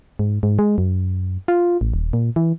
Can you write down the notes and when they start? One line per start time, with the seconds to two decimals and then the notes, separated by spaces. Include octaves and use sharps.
0.19 G#2
0.43 G#2
0.59 G#3
0.78 F#2
1.48 F4
1.81 A1
1.94 D#1
2.13 A#2
2.36 E3